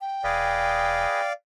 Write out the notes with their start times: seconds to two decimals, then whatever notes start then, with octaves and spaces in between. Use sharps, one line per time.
0.01 G5
0.24 E1 G#4 B4 D5 D#5 F5